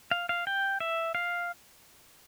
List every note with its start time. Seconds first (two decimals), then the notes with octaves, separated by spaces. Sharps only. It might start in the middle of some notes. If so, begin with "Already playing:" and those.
0.11 F5
0.29 F5
0.47 G5
0.80 E5
1.15 F5